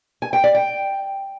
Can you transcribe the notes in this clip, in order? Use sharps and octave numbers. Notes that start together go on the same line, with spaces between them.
G#5
G5
D5
G5